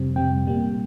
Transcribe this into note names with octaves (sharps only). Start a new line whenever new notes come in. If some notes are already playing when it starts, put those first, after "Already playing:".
Already playing: F2 C3 G3 C4
F2 C3 G3 C4 G5
A#2 G3 A#3